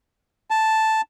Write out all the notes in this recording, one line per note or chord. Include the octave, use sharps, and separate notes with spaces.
A5